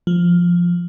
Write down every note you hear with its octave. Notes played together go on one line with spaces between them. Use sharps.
F3